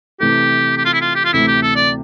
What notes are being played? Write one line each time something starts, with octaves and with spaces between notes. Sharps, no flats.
C3 E3 A3 G4
G4
F4
E4
F4
G4
F4
D2 C3 E3 A3 E4
G4
A4
D5